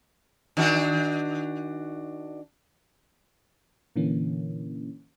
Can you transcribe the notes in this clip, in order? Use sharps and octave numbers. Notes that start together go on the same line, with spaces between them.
D#3 D4 F#4
A#2 D3 E3 A#3 C#4